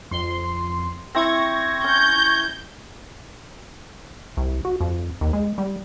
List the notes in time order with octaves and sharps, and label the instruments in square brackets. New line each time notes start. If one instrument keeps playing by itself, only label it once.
[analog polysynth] F2 C6
[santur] C4 E4 [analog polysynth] C#6 G#6 A#6
[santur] C#4 [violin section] G6
[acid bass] C2
F#4
F2
D#2
G#3
G3